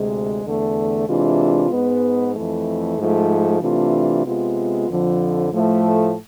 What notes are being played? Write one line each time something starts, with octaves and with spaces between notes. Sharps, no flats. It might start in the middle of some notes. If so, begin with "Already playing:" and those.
Already playing: D2 C3 G#3
E2 D3 A3
C3 E3 G#3 D4 F4
G#2 G#3 B3
F2 E3 A3
G#2 F3 A3
C3 E3 A3 D4 F4
C3 G#3 B3 F4
F2 D3 F3
A2 F3 A3